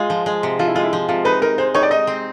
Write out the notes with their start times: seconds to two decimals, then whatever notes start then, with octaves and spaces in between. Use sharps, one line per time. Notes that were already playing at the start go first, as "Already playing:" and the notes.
Already playing: G#3 F4
0.10 F3
0.26 G#3
0.43 C3
0.59 F3 F4
0.67 E4
0.75 G#3 F4
0.84 E4
0.93 F3
1.08 C3 F4
1.25 D#4 B4
1.42 D#4 A#4
1.58 G#3 C5
1.74 D#4 C#5
1.83 D5
1.91 D#4 D#5
2.07 C4